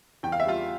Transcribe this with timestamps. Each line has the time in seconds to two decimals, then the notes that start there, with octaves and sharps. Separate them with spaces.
0.23 E2 G5
0.32 F5
0.40 E5
0.46 G3 F4 F5